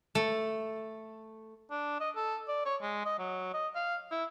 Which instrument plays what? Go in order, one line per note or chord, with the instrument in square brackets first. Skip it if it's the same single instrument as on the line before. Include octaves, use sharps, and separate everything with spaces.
[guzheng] A3
[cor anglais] D4
D#5
A4
D5
C#5
G#3
D#5
F#3
D#5
F5
E4